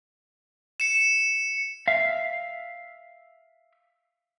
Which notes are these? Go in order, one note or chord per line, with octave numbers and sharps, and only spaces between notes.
C#7 E7
E5 F5